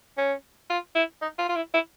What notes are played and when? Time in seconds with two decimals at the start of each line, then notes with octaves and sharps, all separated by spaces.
0.18 C#4
0.70 F4
0.95 E4
1.22 D#4
1.39 F4
1.49 F4
1.56 E4
1.74 E4